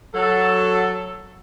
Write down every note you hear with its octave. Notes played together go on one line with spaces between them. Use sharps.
F#3 A4